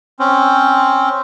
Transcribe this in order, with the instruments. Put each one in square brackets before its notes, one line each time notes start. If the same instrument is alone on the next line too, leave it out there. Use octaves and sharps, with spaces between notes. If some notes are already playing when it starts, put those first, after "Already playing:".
[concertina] C4 C#4